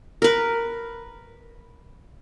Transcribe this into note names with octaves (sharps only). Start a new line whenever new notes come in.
A#4 B4